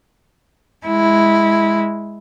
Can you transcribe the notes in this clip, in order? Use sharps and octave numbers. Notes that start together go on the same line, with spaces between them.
G#3 E4